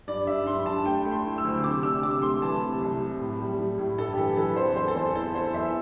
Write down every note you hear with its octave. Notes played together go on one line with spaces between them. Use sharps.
G2 D5
G2 E5
G2 C6
G2 A5
A3 G5
A3
C6
E4
E6
D2
C3 D6
D4 E6
C3 D6
A3 C6
E3 A5
C3
C2
C3
A2
G3
G3
A2
G2 A4
G4
E3 A4
E3 A4
C4 C5
E2 C5
A4
E2 C5
E4 A4
E4 C5
E2 E5